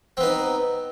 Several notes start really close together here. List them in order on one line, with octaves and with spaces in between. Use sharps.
C4 B3 D#4